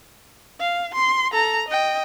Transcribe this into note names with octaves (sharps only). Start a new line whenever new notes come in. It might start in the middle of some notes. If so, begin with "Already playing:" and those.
F5
C6
A4 A#5
D#5 G5